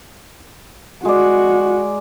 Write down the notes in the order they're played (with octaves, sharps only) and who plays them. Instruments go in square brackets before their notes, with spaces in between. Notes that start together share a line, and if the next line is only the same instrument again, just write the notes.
[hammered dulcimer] G#3 D5 [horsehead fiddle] F#4